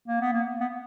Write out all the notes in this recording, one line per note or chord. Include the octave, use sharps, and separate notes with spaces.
A#3
B3
A#3
B3